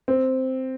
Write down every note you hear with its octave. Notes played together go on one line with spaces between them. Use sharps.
C4